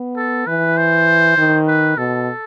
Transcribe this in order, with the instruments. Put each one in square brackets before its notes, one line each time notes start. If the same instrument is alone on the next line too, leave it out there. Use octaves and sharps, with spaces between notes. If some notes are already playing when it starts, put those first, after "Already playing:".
Already playing: [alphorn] B3
[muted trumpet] A4
[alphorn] E3 [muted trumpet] B4
[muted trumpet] C5
[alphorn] D#3
[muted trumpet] B4
[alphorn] B2 [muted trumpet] A4